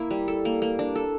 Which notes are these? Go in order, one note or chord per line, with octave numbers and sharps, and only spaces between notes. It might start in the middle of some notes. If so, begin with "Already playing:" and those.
Already playing: A#3 E4
G3
A4
A#3
A#3
D4
A4